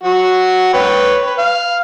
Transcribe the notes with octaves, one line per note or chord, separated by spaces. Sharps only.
F#3 F#4
B4 C#5 G5
B4
F5